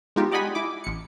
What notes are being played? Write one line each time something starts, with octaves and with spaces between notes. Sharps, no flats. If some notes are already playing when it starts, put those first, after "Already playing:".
G#3 B3 D#4 F4 G4
G4 D5 D#5 F#5 G#5 B5
E4 D6
A1 C#7